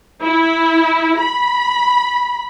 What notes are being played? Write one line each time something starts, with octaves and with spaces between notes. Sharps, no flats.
E4
B5